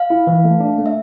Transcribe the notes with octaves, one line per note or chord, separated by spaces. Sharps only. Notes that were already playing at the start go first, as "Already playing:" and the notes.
Already playing: F5
E4
E3
A3
D4
A3
E5